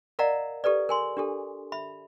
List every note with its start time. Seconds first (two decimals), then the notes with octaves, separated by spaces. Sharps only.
0.19 A#4 D5 D#5 F5 F#5 A#5
0.64 G4 A4 B4 D5
0.89 A#4 G#5 C6
1.17 D4 G4 A4
1.72 E5 B5